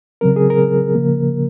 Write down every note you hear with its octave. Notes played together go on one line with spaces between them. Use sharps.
C#3 F#3 C4 A#4
G#4
A#4
C#3 F3 A#3